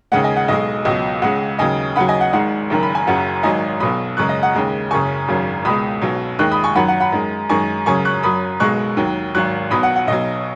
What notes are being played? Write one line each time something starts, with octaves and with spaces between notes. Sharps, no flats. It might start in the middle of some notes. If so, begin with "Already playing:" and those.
D#2 C#3 G#3 F#5
D#5 G#5
F#5
B1 B2 G#3 D#5
C#2 B2 F#3 D#5
C#2 C#3 G#3 F#5
D#2 C#3 F#3 D#5 G#5
D#2 C#3 F#3 F#5 B5
D#5 G#5
F#5
G#1 G#2 G#3 F#5
F#1 F#2 D#3
B5
G#5
F#1 F#2 C#3 F#3 F#5
G#1 G#2 F#3 D#5 G#5
B1 B2 F#3 B5 D#6
F#2 C#3 G#3 C#6 F#6
D#5
F#5
D#2 C#3 G#3
F#1 F#2 C#3 G#5 C#6
G#1 F#2 C#3 F#3
C#2 B2 G#3 B5 D#6
B1 B2 F#3
D#2 D#3 G#3 C#6 F#6
B5 D#6
G#5 C#6
F#2 D#3 F#3 F#5 B5
F#5
F#5 B5
F#2 D#3 G#3
F#2 D#3 G#3 G#5 C#6
F#2 C#3 F#3 G#5 C#6
C#6 F#6
F#2 F#3 B5 D#6
B1 B2 G#3 C#6 F#6
D#2 D#3 F#3
G#1 G#2 F#3 C#6 F#6
B1 B2 F#3 B5 D#6
F#5
F#5
B1 B2 F#3 D#5